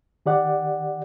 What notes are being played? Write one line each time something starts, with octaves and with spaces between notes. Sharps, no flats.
D#3 G4 D5 F#5